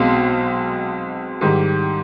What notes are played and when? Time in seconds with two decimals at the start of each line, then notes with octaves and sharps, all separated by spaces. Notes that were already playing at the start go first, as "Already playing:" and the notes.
Already playing: B1 B2 G#3 C4 F5
1.41 G#2 D#3 G3